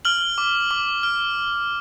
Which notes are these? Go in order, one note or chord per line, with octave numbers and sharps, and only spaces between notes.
F6 F#7
D6
D6
F6